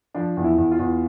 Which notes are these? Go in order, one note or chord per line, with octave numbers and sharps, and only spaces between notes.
F3 D4
E2
E4
E2
F4
E2